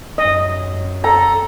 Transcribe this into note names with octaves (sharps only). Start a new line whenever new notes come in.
F#2 D#5
A4 A#5